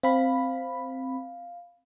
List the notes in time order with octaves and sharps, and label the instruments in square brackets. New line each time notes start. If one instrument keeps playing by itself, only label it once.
[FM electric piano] C4 B5 [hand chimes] F5